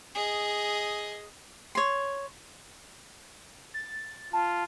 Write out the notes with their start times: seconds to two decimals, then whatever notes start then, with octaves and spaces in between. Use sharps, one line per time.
0.15 G#4 D#5
1.75 C#5 C6
3.74 A6
4.33 F4 A5